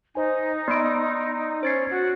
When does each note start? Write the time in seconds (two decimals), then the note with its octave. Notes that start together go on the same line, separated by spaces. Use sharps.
0.15 D#4 C5 G#5
0.68 B3 D5 B5 C6 E6 D7
1.63 C#4 C5 A6 C7
1.91 F#4